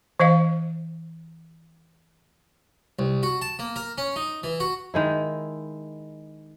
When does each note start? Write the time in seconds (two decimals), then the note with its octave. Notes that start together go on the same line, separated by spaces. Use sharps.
0.20 E3 C5 D#5 F5
2.99 C2
3.23 F#4
3.42 A5
3.59 A#3
3.76 A#4
3.98 C#4
4.16 D#4
4.43 E3
4.60 F#4
4.94 D#3 G#3 E4